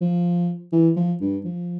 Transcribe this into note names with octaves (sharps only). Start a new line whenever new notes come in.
F3
E3
F3
G2
F3